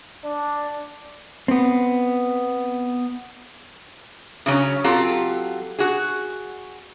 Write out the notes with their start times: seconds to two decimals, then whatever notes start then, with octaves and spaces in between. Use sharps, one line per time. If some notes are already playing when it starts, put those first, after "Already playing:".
0.25 D4
1.48 B3 C4
4.46 C#3 F#3 C#4
4.84 F#3 C4 F4 G4 A4
5.79 F#4 G#4